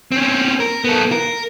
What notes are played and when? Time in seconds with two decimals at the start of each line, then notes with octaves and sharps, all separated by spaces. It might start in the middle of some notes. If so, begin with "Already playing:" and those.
0.12 C4 C#4
0.60 A#4
0.84 B3 A4
1.12 A#4